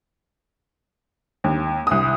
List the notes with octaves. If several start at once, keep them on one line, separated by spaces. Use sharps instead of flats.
D#2
C2 D#6